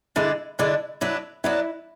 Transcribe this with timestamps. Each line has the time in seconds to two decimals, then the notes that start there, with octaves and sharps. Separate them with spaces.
0.16 D3 G#3 D4 E4
0.59 D3 G#3 D4 E4
1.01 F#3 B3 D4 E4
1.44 F#3 B3 D4 E4